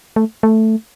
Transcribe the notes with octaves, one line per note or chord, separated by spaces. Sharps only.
A3
A3